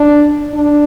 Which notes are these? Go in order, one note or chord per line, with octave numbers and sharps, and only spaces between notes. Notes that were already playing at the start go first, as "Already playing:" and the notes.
Already playing: D4
D4